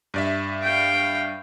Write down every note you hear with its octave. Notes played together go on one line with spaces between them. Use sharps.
G2 D5 E5
F5 G5